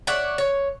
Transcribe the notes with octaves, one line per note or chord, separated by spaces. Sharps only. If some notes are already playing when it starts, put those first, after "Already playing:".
C#5 D5 E5 F#5
C#5